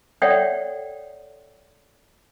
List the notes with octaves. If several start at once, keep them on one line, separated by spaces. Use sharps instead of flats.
A4 C#5 D5 E5 F#5 G5